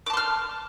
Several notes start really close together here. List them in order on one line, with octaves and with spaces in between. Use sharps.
D6 A5 C6 F6